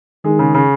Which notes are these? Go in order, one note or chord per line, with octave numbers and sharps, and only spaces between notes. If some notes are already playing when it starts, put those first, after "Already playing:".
D#3 G#3
C#3
C#3